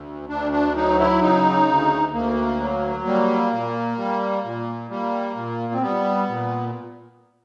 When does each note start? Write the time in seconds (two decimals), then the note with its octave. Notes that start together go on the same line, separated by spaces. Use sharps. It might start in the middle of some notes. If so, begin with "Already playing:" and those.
Already playing: D2
0.29 D2 D4
0.52 D4
0.75 F#3 D#4
0.99 E4
1.22 C#3 D#4
1.68 D2
2.13 D2 A#3
2.60 F#3
3.05 G3 A#3
3.52 A#2
3.98 G3
4.45 A#2
4.90 G3 A#3
5.36 A#2
5.74 C4
5.82 G3 B3
6.29 A#2